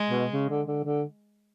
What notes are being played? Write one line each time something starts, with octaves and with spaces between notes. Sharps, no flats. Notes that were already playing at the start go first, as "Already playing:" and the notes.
Already playing: G#3
B2
C#3
D3
D3
D3